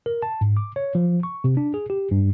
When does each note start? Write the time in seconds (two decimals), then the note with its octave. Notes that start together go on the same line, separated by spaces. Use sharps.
0.06 A#4
0.22 A5
0.41 G#2
0.57 D6
0.76 C#5
0.95 F3
1.23 C#6
1.44 C3
1.57 D4
1.74 G#4
1.90 G4
2.11 G2